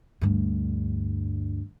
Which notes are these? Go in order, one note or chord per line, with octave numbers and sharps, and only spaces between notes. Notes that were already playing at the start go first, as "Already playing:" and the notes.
D2 G2